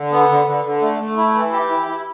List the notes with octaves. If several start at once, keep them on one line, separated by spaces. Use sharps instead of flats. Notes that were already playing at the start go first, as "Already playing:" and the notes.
Already playing: D3
B3
D3
D3
D3
A3
A3
E4
E3
G4
E4
E4